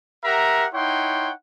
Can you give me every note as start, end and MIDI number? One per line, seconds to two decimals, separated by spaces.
0.24 0.66 67
0.24 0.66 70
0.24 0.66 76
0.24 0.66 78
0.24 0.66 82
0.74 1.31 63
0.74 1.31 64
0.74 1.31 73
0.74 1.31 78
0.74 1.31 79
0.74 1.31 84